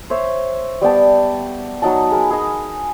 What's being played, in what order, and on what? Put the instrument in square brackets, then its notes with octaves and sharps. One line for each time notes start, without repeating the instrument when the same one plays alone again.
[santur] C5 C#5 E5
G3 B3 G5 A5
F#3 D#4 F#5 A5
G#4 A#4 B5
G#4 D#5